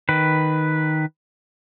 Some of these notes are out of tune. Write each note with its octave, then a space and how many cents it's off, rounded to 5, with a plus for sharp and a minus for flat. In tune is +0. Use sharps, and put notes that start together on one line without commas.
D#3 +0 B4 +0